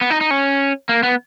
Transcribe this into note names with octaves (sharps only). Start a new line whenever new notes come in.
B3
D#4
D#4
C#4
A#3
B3